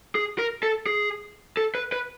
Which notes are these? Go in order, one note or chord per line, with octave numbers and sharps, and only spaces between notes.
G#4
A#4
A4
G#4
A4
B4
B4